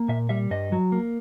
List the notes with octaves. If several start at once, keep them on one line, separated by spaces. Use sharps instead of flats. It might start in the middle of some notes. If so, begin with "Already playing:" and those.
Already playing: A#3
A#2 E5
G3 E5
G2 D#5
F#3
A#3